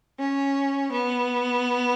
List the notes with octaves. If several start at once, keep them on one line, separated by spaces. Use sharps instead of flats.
C#4
B3